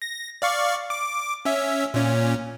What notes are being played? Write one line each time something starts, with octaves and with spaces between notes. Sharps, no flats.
A#6
D5 F5 C#6
D6
C#4 E5
A#2 C#4